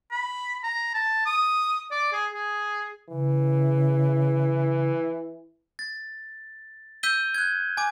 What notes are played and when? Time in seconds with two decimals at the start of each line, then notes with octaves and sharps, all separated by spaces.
0.11 B5
0.63 A#5
0.94 A5
1.26 D#6
1.91 D5
2.13 G#4
2.33 G#4
3.11 C#3 E3
5.79 A6
7.03 E6 G6 B6 D#7 G7
7.34 F#6 G#6
7.77 G#5 D6